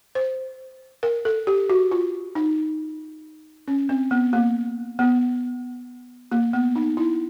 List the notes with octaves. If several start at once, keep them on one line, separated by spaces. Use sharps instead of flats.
C5
A#4
A4
G4
F#4
F4
D#4
C#4
C4
B3
A#3
B3
A#3
B3
D#4
E4